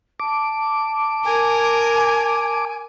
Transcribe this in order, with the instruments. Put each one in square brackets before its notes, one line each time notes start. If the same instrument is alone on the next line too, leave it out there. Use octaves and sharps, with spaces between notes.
[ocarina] A5 [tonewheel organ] D6
[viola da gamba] A#4 [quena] G#5